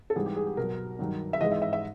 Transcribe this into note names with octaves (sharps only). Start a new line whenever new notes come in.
A4
G#2 E3 G3 G#4
G4
G#4
G4
B2 F#3 A#4
G2 D#3 F#3
E5
G#2 E3 G#3 D#5
E5
E5
E5